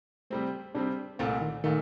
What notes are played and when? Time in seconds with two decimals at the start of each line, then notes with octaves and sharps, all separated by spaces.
0.30 C3 G3 A3 C4
0.75 C3 G3 C4 D4
1.19 C2 A#2 A3 C4
1.41 D#3
1.64 A#2 D#3 A3